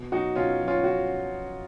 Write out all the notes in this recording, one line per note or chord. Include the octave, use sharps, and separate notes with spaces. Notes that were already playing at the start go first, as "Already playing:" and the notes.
Already playing: B2
F#3 D#4 F#4
B2 C#4 F4
F#3
C#4 F4
F#4